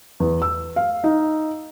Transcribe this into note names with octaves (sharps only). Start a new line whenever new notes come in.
E2
E6
F5
D#4